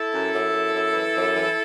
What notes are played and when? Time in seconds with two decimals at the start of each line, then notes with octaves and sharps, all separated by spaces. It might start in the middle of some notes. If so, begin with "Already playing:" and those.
Already playing: E4 A4
0.11 F#2
0.33 F#2
0.53 F#2
0.74 F#2
0.94 E3
1.15 F#2
1.36 E3